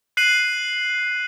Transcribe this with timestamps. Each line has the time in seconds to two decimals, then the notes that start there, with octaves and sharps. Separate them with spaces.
0.17 F#6 C7 D#7 F#7